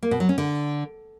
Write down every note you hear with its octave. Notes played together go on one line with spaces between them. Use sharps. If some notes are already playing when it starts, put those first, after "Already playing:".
A#3
B2
F#3
C#4
D3